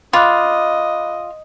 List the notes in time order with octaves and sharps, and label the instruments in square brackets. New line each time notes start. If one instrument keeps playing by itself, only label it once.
[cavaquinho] F4 [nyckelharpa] D#5 [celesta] B5 D6 F#6